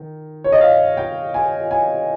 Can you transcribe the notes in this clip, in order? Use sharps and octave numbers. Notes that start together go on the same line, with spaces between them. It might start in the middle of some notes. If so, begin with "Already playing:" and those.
Already playing: D#3
C#5
D#5
F5
G5
G#5
G#5